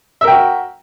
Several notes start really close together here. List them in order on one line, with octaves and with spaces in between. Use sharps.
E5 A#4 G5 F#4